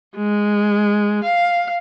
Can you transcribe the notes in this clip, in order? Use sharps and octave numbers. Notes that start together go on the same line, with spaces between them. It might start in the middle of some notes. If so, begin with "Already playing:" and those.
G#3
F5